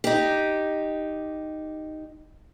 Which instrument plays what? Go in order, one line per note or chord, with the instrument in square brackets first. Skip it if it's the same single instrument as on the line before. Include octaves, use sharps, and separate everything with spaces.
[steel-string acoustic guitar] D#4 G4